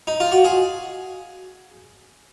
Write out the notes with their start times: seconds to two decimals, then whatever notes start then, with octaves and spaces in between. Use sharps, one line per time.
0.07 D#4
0.20 F4
0.32 F#4
0.44 G#4